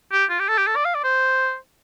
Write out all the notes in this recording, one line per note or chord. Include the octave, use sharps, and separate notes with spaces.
G4
F4
G4
A4
G4
A4
D5
F5
D5
C5